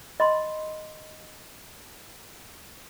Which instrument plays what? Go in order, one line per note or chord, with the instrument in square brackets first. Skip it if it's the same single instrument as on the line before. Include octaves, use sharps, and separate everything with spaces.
[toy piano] D#5 B5 C6